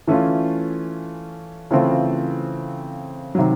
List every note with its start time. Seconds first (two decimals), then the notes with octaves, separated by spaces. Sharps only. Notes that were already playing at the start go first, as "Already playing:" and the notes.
0.07 E3 A3 C#4 F4
1.71 C#3 E3 A3 C4 F4
3.35 C3 D#3 F#3